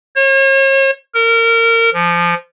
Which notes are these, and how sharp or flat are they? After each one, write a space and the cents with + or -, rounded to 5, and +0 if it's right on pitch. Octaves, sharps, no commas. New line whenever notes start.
C#5 -40
A#4 -25
F3 -15